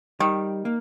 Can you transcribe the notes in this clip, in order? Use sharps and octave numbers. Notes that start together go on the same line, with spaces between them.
D#3 G3
A#3